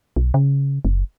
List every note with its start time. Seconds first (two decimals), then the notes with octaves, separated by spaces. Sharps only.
0.16 B1
0.34 C#3
0.85 F#1